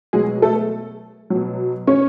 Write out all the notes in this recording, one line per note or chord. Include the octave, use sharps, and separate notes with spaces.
B2 F#3 G#3 G#4
A3 A4
B2 F#3
C#4 C#5